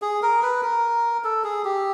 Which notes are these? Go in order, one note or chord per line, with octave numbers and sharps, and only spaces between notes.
G#4
A#4
B4
A#4
A4
G#4
G4